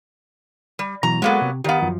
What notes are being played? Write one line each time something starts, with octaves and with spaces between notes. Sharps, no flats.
G3
B2 E3 F#3 A#5
F#3 G#3 A#3 B3 A4
C3
D#3 B3 G4 D5 F5
F#2 F3